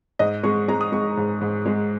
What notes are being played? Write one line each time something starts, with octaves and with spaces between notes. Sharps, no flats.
G#2 D#5
G#3 C#6
G#3 A#5
D#6
G#3 C#6
G#2
G#2
G#3